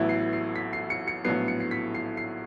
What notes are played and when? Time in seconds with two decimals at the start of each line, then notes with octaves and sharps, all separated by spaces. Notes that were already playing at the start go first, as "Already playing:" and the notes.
Already playing: A1 A2 F#3 B3 E4
0.09 C7
0.33 C7
0.56 B6
0.73 C7
0.90 C#7
1.08 C#7
1.25 A#1 A2 F#3 B3 C7
1.48 C#7
1.60 C7
1.71 B6
1.95 C7
2.17 C7